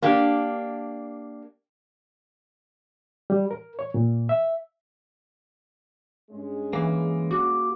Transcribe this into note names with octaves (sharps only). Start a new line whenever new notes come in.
A#3 D4 G4
G3
A#4
C#5
A#2
E5
G2 G#3 C#4
E3 A#3
F#4 D6